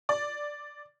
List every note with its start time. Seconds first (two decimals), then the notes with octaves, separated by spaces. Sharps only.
0.09 D5